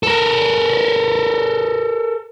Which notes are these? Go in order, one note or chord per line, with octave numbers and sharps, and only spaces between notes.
A4 A#4